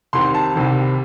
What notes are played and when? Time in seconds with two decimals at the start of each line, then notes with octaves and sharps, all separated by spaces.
0.13 C2 C3 D#3 C6
0.34 A5
0.55 C2 C3 D#3